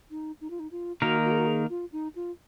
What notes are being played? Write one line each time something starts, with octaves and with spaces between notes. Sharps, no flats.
D#4
D#4
F4
D#4
F4
D#3 A#3 D#4 F#4 A#4
F#4
G#4
F#4
G#4
F4
D#4
F4